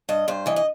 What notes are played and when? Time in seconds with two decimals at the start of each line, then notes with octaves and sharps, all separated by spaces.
0.09 G2 D#5
0.28 G2 C5
0.46 E3 D#5
0.56 D#5